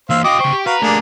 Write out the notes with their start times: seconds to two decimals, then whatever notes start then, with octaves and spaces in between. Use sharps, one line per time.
0.10 E3 A#3 C5 F5 E6
0.24 F#4 D#5 F5 G5 D6 D#6
0.40 C#3 C5 C#6
0.52 G4
0.66 F#4 B4 F5 A#5
0.82 A3 A#3 D4 G4 G#4